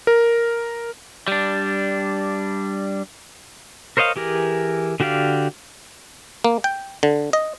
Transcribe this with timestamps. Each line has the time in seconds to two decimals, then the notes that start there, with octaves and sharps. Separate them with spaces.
0.07 A#4
1.28 G3 D4
3.97 A#4 C5 C#5 D#5 F5
4.16 E3 G4 G#4 A#4
5.00 D3 F#4 G4 D5 F5
6.44 A#3
6.64 G5
7.03 D3
7.33 D#5